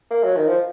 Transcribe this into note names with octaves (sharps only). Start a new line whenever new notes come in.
A#3
F#3
D#3
F3